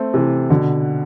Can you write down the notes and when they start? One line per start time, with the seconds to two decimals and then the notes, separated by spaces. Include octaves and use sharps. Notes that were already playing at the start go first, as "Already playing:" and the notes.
Already playing: A3 C4
0.14 C3 E3
0.50 B2 D3